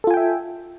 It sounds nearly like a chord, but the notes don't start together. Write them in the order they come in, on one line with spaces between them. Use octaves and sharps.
A4 F4 G#5 G5 E5